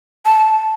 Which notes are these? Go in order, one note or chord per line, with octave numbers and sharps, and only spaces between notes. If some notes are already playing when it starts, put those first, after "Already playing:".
A5